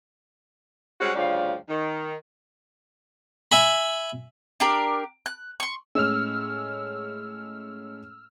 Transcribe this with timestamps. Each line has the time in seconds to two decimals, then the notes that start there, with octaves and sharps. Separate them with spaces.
1.00 G3 G#3 C4 C#4 F#4
1.16 D2 G2 C#3 F3 D5 F5
1.68 D#3
3.52 E5 G#5 B5
4.60 D4 G4 A#4
5.26 F#6
5.60 C6 C#6
5.95 A2 G#3 C#4 E6 F6